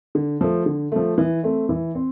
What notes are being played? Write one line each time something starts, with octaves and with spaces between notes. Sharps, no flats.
D3
F3 A3
D3
F3 A3
E3
A3 C4
E3
C4